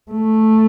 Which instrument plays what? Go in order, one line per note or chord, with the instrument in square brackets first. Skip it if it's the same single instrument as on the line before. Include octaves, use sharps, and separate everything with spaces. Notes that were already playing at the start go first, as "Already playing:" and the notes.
[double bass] A3